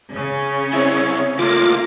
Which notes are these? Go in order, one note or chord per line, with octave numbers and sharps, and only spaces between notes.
C#3 C#4 C#5
C4 E4
C#3 A3 A#3 F4 D6